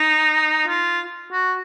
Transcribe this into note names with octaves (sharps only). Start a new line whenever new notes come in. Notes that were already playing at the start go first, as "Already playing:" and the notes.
Already playing: D#4
F4
F#4